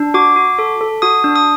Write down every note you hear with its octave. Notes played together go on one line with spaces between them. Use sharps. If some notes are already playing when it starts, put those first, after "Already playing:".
Already playing: D4
F#4 D6
F#4
A4
A4
F#4 D#6
D4
D#6